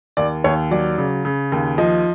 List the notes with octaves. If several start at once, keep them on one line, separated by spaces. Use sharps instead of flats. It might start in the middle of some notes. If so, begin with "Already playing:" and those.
D#2 D5
D#2 C#5
F#3 D5
C#3
C#3
D#2
F3 D#5